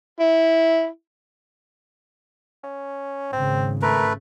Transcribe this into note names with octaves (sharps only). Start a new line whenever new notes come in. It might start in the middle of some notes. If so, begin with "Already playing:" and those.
E4
C#4
G#1 C#3 C4
A3 A#4 B4